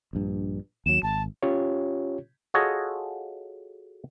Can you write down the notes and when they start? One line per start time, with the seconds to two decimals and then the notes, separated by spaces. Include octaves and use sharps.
0.13 A#1 G2
0.86 D#2 F#3 E7
1.03 G#1 A5
1.43 C#4 F4 G4 C#5
2.54 F4 F#4 G#4 A4 C#5 D#5